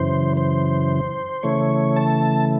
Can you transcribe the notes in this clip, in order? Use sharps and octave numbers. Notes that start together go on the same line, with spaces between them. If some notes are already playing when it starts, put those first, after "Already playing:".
Already playing: F#2 C#3 E3 C5
C5
C#3 E3 A3 C#5
A5